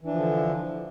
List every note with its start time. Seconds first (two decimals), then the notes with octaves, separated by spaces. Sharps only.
0.01 E3
0.06 D4
0.11 F3
0.16 D3